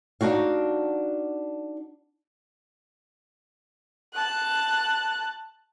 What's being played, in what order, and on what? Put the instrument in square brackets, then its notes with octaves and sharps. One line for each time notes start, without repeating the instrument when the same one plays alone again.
[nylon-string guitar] D4 D#4 F#4 F5
[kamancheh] A5 F#6